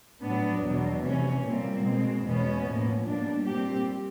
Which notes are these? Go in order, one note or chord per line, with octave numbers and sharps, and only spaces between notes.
A2 F#3 B3 D4
E2 B2 F#3
C3 E3 A3 C#4
A#2 G3 A#3 C4
B2 G#3 C4
E2 B2 G#3 B3 C#4
A2 F3 A#3
B2 G3 A#3 D4
A#2 G3 C4 G4